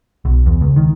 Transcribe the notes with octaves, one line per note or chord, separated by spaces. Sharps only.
B1
E2
C#2
D#3